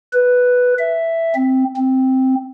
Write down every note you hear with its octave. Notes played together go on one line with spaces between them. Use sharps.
B4
E5
C4
C4